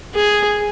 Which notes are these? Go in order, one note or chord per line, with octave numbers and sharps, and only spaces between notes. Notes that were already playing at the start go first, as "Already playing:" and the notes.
G#4